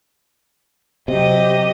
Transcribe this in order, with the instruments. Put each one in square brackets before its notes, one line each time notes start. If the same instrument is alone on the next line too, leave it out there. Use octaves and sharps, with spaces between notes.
[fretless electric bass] C3 [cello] F#3 G4 [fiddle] D#5